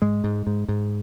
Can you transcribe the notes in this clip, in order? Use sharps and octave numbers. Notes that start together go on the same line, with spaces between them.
G#2 G#3
G#2
G#2
G#2